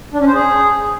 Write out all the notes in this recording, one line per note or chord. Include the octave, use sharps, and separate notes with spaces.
D4
C#4
C5
G#4